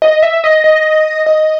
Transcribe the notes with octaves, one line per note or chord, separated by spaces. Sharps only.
D#5
E5
D#5
D#5
D#5